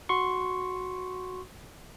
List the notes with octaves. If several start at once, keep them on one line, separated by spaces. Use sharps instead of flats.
F#4 C6 C#6